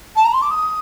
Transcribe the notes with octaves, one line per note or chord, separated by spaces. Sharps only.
A5
A#5
C6
D6
D#6